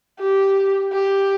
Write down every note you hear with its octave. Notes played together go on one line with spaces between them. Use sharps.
G4
G4